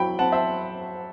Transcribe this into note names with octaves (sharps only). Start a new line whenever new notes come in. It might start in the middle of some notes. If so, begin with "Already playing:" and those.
Already playing: F#3 E4 G5 B5
C4 F#5 A5
C5 E5